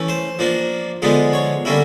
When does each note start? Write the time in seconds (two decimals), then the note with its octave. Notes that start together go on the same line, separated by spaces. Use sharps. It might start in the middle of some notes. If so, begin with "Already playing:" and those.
Already playing: E3 A3 C#4
0.08 C5
0.39 F3 A#3 D4
1.02 D3 F3 G#3 B3 D#4
1.33 C#5
1.65 D3 G3 A#3 C#4 E4